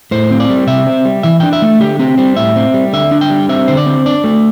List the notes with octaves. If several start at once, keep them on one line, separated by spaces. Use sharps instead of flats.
A2 C5
C4
D5
G3
C3 E5
C4
G3
E3 E5
D4 G5
E5
A3
D3 G4
C4 G4
G3 C5
A2 E5
C4
G3
D3 E5
D4
G5
G3
C4 E5
D3 C5
D5
C4
D4 D5
A3